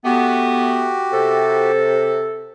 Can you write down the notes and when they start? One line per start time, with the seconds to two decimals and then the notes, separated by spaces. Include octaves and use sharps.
0.05 A3 B3 F#4 G4
1.12 C3 A4